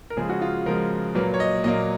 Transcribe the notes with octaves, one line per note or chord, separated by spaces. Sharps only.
A#4
C#3 F3 G#3 G#4
F#4
F4
C#3 F3 G#3 A#4
A#2 F#3 A#3 B4
C#5
D#5
A#2 F#3 A#3 D#5